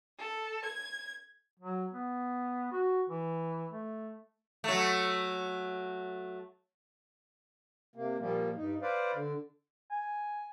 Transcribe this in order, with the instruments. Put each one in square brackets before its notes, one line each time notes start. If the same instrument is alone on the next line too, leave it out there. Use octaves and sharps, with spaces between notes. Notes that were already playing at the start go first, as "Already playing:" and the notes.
[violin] A4
G#6
[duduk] F#3
B3
F#4
E3
A3
[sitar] F#3 A3
[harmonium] C3 A#3
A#2 F3 G3 A#3
G2 D#4
B4 C5 D5 F5
D3
[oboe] G#5